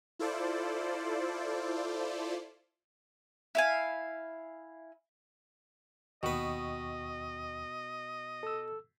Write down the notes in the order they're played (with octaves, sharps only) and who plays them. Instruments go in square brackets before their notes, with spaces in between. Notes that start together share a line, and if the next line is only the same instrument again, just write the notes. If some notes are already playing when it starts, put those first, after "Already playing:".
[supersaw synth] E4 F4 A4 C5 D5
[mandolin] E4 F5 G#5
[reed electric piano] D#2 G5 C#6 [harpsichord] B2 B4 [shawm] D#5
[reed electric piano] A4 E6